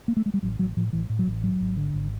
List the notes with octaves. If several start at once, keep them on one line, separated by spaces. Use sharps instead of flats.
A#3
A3
G#3
G3
A1 F#3
A1 F#3
A2 F3
A1 E3
A2
F#3
A1
G#1 F#3
G#1
D3
G#1